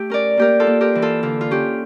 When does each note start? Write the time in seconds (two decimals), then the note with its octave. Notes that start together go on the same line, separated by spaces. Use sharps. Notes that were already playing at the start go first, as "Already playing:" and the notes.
Already playing: A3 G4
0.10 C#4 A#4 D5
0.37 A#3 G4 A#4
0.60 F4 A4
0.67 A#3
0.81 G4 A#4
0.95 E3
1.02 F4 A4
1.23 D3 F4
1.41 F4
1.51 C#4 G4